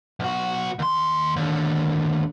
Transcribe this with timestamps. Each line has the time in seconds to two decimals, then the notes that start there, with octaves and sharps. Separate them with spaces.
0.20 B1 F#4
0.79 D#2 C6
1.36 D#2 D3